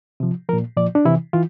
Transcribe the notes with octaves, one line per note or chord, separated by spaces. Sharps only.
C3 F3
A#2 F3 A#4
A#2 F3 D5
D4
C3 E3 E4
E3 F4